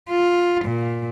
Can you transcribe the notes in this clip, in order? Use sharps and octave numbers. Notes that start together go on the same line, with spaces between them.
F4
A#2